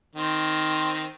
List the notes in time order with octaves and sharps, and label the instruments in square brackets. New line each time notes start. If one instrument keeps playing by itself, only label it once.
[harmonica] D#3 C4